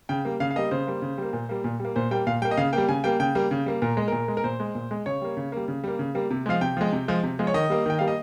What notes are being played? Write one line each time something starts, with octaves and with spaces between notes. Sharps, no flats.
C#3 G5
G3 A#3
C#3 F5
F5
G3 A#3 D#5
C#3 C5
G3 A#3
C#3
G3 A#3
A#2
G3 A#3
A#2
G3 A#3
A#2 C5
G3 A#3 G5
A#2 F5
G3 A#3 G5
D#5
C#3 F5
G3 A#3 G5
C#3 G#5
G3 A#3 G5
C#3 G5
G3 A#3
C#3
G3 A#3
A#2 A#4
G#3
A#2 A#4
G#3
A#4
A#2 C5
G#3
A#2
G#3
C#3 C#5
G3 A#3
C#3
G3 A#3
C#3
G3 A#3
C#3
G3 A#3
C3
F3 G#3 F5
C3 G5
F3 G#3
C3
F3 G#3
C3
F3 G#3
C#5
D#3 D#5
G3 A#3
D#3 G5
G3 A#3 F5
D#5